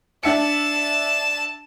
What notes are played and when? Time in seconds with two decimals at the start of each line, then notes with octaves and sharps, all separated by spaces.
0.23 D4 E5 A5 C#7